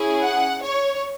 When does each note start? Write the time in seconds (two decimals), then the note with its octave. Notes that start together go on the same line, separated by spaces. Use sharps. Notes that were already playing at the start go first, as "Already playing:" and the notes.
Already playing: C#4 E4 G#4
0.22 F#5
0.62 C#5